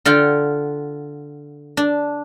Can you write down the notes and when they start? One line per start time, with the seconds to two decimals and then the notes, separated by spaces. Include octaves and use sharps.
0.05 D3 F4 F#5 G5
1.77 D4